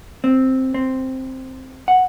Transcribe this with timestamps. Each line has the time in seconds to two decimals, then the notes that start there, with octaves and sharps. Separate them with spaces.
0.24 C4
0.74 C4
1.88 F#5